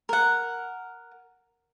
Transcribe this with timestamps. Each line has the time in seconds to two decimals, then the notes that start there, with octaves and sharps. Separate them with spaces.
0.09 A#4 F#5